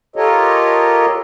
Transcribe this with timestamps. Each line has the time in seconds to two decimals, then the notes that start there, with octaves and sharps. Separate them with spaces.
0.16 F4 G4 A4 A#4 C#5 D#5